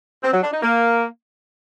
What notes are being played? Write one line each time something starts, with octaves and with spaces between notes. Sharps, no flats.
C4
F#3
D4
D#4
A#3